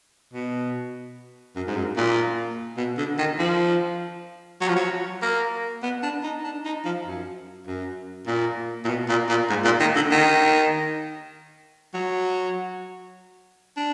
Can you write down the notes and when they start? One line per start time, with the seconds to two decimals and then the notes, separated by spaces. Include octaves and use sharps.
0.33 B2
1.56 F#2
1.67 G#2
1.76 F#2
1.97 A#2
2.77 B2
2.98 D3
3.18 D#3
3.39 F3
4.61 F#3
4.69 F3
4.76 F#3
5.22 A#3
5.83 B3
6.03 D4
6.23 D#4
6.44 D4
6.65 D#4
6.85 F3
7.05 F#2
7.67 F#2
8.27 A#2
8.85 A#2
8.88 B2
9.09 A#2
9.29 A#2
9.49 G#2
9.64 A#2
9.80 D#3
9.95 D3
10.11 D#3
11.94 F#3
13.77 D4